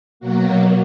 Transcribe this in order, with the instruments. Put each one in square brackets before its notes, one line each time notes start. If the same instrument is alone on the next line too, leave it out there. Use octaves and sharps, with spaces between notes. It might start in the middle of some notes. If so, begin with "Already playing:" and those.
[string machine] B2 F#3 A#3 F#4